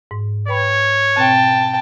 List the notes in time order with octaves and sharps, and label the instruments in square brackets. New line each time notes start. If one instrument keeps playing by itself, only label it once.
[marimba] G#2
[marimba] B4 G5 B5 [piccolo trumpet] C#5
[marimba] B2 C4 F#6 [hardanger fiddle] G5 A5